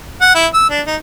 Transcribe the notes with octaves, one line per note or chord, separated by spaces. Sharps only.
F#5
E4
E6
D4
D#4